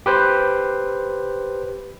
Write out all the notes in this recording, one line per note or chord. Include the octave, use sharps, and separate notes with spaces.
G4 B4 C5